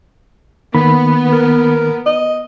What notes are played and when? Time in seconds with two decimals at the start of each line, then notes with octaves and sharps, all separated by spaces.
0.75 D#3 A#3 B3 B5
1.32 A#4
2.06 D#5